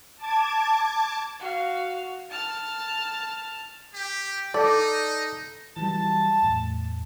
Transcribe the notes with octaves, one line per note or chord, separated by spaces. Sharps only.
A5 D6 G#6
F#4 F5
A5 F6
G4
D#4 A4 D5
E3 F#3 G3 A5
E2 A2